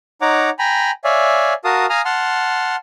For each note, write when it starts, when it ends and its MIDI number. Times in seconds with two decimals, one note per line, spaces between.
0.22 0.50 63
0.22 0.50 73
0.22 0.50 78
0.22 0.50 82
0.22 0.50 86
0.59 0.91 79
0.59 0.91 80
0.59 0.91 82
0.59 0.91 83
1.04 1.54 73
1.04 1.54 74
1.04 1.54 76
1.04 1.54 77
1.04 1.54 80
1.65 1.86 66
1.65 1.86 70
1.65 1.86 77
1.65 1.86 81
1.65 1.86 87
1.90 2.01 77
1.90 2.01 80
1.90 2.01 82
1.90 2.01 87
1.90 2.01 89
2.05 2.76 78
2.05 2.76 81
2.05 2.76 84
2.05 2.76 89